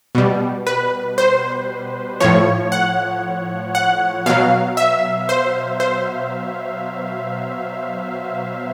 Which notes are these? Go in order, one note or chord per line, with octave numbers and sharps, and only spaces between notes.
B2 G3
B4
C5
A2 F3 C#5
F#5
F#5
B2 F#3 F5
E5
C5
C5